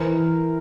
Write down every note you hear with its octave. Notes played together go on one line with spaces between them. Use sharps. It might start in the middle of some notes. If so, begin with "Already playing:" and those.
Already playing: E3 A#4 C5